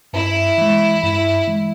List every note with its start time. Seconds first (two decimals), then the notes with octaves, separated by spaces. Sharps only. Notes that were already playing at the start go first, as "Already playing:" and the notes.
0.13 G2 E4
0.58 E3 G#3
1.03 G2 E4
1.47 E3 G#3